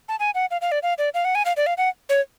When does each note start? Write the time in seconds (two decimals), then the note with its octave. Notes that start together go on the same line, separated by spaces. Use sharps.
0.09 A5
0.20 G#5
0.35 F#5
0.51 F5
0.61 F5
0.72 D5
0.83 F5
0.98 D5
1.14 F5
1.25 F#5
1.35 G#5
1.45 F5
1.57 D5
1.67 F5
1.78 F#5
2.09 C#5